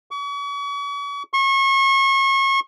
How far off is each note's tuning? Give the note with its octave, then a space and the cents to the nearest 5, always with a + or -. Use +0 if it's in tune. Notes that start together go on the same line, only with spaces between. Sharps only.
C#6 +40
C#6 -35